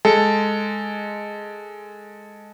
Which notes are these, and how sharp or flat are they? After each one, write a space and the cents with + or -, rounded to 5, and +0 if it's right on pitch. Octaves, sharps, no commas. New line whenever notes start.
G#3 +0 A4 +0